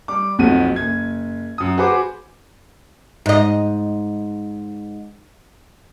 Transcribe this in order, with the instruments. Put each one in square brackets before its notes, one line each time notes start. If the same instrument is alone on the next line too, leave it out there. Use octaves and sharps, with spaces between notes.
[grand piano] G3 D6
B1 F2 F#4 D#7
F#1 G#6
F#2 D#6
F#4 G#4 B4 C5 D6
[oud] G#2 D#5